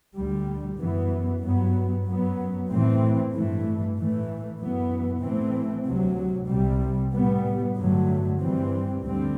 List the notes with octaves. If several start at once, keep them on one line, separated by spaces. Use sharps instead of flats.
D2 D3 G3
F#2 E3 B3
G2 F#3 B3
F#2 F#3 B3
A2 E3 A3 C4
G2 E3 A3
A2 E3 A3
F#2 E3 B3
A2 E3 A3 C4
D2 C3 F#3
C2 C3 G3
A2 G3 B3
G2 D3 F#3 A3
G2 E3 G3 C4
D2 D3 G3 C4